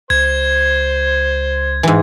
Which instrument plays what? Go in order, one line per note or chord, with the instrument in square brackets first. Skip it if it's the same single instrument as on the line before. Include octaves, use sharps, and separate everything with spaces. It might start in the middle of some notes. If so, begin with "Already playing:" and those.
[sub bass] C#2 [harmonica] C5 [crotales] G#6
[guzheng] G#2 E3